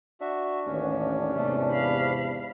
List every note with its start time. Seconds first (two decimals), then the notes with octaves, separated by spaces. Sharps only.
0.21 D4 F#4 E5
0.66 A1 D#2 C#4
1.35 E2 G#2 C3 A3 A#3
1.72 F5 B5